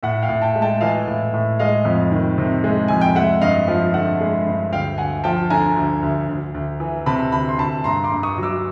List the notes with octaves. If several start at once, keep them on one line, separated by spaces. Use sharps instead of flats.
A2 E5 F#5
F5 G5
A2
G5 A5
G#3
G5 A5
E3 D#5 F5
A2
A2
G#3 D#5 F5
F2
D#3
C3
G#3
F2 G#5
G5
G#3 E5 F#5
G2 D#5 F5
F3
D3 E5 F#5
G#3
G2
D2 F5 G5
D2 F#5 G#5
F3 G5 A5
D3 G#5 A#5
D2
D2
D2
D2
E3
C3 A5 B5
D2 A5 B5
C6
D2 A5 B5
G2 A#5 C6
C6 D6
G2
C#6 D#6
F#3
D6 E6